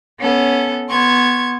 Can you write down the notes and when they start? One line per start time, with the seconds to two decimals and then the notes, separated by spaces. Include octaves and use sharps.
0.20 B3 C#4 A4
0.89 B3 C6 C#6 G#6